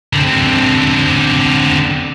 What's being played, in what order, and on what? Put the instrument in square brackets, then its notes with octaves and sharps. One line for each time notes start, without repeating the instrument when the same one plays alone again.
[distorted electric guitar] D3 C4